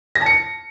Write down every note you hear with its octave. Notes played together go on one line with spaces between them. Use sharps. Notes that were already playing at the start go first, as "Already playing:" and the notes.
A#6
A5
C#7